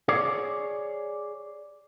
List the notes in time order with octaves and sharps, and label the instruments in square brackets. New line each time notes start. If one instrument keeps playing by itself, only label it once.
[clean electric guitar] G#4 C#5 D5